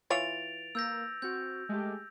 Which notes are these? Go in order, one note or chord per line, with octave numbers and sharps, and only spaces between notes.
E3 F4 C#5 A6 D7 F7
A#3 E6 G6 A#6
C4 F#4 G6
G#3 A3 G4